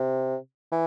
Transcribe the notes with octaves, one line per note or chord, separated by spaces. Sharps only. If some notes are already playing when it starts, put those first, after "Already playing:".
Already playing: C3
E3